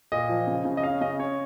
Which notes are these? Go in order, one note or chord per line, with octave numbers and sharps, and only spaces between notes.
A#2 D#5
F3
C#3
C#3
D#5
C#4 F5
C#3 D#5
C#4 C#5